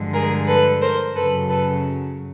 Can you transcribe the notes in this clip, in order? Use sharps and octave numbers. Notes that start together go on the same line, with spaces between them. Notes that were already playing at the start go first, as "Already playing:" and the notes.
Already playing: G2 D3 F3 G#3
G#4 A#4
A4 B4
A#4 C5
F#2 C#3 F#3 A4 B4
A4 B4